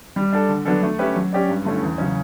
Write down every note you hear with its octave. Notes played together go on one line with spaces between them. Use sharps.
G3
D4 A4
D3
F#3 B3 D4 A4
A3
C#4 G4 B4 E5
F#3
C#4 G4 D5
G2
D3 A3 C#4 E4
E2
C#3 F#3 C#4